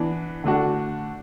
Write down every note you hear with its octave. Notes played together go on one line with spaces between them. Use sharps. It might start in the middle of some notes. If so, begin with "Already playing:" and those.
Already playing: E3 B3 D4
D3 A3 D4 F#4